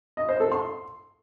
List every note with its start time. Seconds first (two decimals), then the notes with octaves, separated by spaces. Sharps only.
0.17 D#5
0.29 C5
0.40 A4
0.52 C6